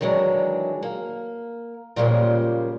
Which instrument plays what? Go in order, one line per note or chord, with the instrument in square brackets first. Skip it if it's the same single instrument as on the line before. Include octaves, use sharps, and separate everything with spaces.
[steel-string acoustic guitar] D#3 E3 F#3 G#3 D4
A#3
A#2 C#3 F3 G3 G#3 A#3